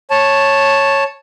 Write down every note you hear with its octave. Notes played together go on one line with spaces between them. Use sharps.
C#5 A5